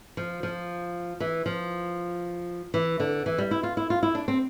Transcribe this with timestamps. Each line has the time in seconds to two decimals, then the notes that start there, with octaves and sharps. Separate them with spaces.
0.17 F3
0.43 F3
1.20 E3
1.46 F3
2.74 E3
3.00 D3
3.26 E3
3.38 G3
3.51 E4
3.63 F4
3.77 E4
3.90 F4
4.03 E4
4.15 D4
4.28 C4